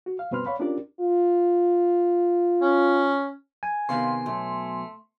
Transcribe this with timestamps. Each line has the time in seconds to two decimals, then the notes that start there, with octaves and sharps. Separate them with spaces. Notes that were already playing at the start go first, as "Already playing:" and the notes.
0.06 F#4
0.19 F5
0.31 G2 B2 C4 B4 C6 F6
0.46 C#5 D5 F5 F#5 B5
0.59 C#4 D4 F4 G4 A#4 D5
1.00 F4
2.62 C#4
3.63 G#5
3.89 C3 D#3 B3 F5 C6
4.26 B1 A3